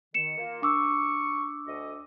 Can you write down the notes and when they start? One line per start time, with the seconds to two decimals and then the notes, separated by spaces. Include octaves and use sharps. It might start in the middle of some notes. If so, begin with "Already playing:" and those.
0.14 D#3 C#7 E7
0.37 A#3 F4
0.62 D4 C#6 D6 E6
1.66 D2 D#5